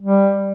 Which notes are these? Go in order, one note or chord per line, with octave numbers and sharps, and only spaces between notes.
G3